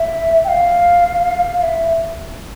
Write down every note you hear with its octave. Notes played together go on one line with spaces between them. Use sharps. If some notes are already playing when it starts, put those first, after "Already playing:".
Already playing: E5
G5
F5
F5
E5